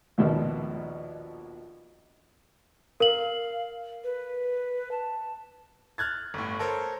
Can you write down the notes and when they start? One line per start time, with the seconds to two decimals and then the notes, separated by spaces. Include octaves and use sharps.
0.18 A#1 D#2 B2 F3
3.00 A#4 F5 F#7
4.04 B4
4.91 A5
5.98 F6 F#6 G#6 A6
6.34 G1 A2
6.59 A4 A#4 C5 C#5